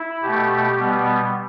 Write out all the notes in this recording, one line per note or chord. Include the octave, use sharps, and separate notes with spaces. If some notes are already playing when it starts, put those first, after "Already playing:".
Already playing: E4
B2 A3 G4
B2 G3 B3